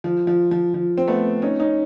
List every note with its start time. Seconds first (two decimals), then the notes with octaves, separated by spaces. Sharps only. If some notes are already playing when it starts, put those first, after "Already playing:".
0.04 F3
0.27 F3
0.51 F3
0.74 F3
0.98 C4
1.08 A3 B3
1.42 C#4 D#4
1.60 C#4 D#4